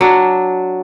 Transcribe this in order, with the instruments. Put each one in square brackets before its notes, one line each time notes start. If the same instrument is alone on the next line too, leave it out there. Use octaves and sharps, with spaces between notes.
[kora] F#3 D4